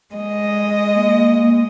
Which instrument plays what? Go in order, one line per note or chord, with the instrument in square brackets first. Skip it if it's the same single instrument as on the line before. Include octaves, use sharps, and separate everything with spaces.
[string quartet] G#3 D#5
[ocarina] A#3